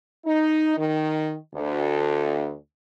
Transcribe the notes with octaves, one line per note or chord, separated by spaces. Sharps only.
D#4
D#3
D2